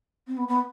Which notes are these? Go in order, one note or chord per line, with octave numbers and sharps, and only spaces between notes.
C4
B3
B3